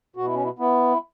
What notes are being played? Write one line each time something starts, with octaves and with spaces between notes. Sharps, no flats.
B2 F#4
E4
C#4
E4
B3 E4